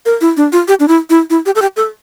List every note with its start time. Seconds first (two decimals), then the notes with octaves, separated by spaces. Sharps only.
0.06 A#4
0.21 E4
0.37 D4
0.52 F4
0.68 G4
0.80 D4
0.88 E4
1.10 E4
1.30 E4
1.46 G4
1.55 A4
1.62 G4
1.76 A4